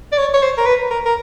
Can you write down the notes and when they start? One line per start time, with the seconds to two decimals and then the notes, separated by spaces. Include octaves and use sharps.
0.12 D5
0.18 C#5
0.34 C#5
0.43 C5
0.58 A#4
0.66 B4
0.91 A#4
1.06 A#4